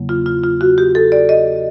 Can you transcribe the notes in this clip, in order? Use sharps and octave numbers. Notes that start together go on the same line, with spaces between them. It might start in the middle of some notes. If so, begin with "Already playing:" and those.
Already playing: E2 C#3 F#3 A#3
F4
F4
F4
F#4
G4
A4
D5
D#5